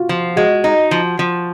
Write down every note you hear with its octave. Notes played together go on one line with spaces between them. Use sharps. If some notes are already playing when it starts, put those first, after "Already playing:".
Already playing: F4 F#4
F3
G#3 F#4
D#4
F3
F3